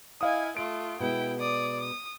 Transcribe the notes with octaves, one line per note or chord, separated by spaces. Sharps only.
E4 D#5 F5 G#5 D#6
A3 F4 D7
B2 G#3 E4 G5
D5 D#6
D#6